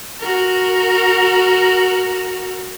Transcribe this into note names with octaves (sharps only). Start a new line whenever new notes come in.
F#4 A#4